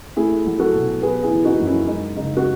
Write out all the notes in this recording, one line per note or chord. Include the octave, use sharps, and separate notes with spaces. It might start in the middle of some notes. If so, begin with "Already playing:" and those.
A3 E4 G#4
F#3
F#4 A4
B2
B3 G#4 B4
E4 G#4
E3
D#4 F#4
F#2
C#4 E4
G#3 D#4
C#3 D#4
F#4